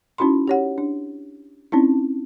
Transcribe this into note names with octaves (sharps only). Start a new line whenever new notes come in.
C#4 D#4 E4 F#4 B5 C6
G4 C#5 F#5
D4
C4 C#4 D#4 E4